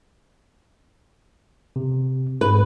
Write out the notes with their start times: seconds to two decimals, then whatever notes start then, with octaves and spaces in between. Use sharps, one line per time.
1.76 C3
2.41 G#2 B4